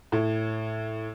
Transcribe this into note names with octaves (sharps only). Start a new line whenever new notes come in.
A2